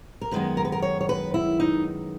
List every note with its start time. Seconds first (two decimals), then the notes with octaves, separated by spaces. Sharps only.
0.21 A#4
0.31 F#2 D#3 G#3 B3 B4
0.57 A#4
0.65 B4
0.72 A#4
0.82 C#5
1.01 C#5
1.09 B4
1.34 E4
1.60 D#4